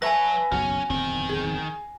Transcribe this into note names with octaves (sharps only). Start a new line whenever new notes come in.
F#3 B4 C#5 E5 G#5 A5 A#6
F#1 B1 E2 C#4 F#4
D1 E2 D#3 C4
G#4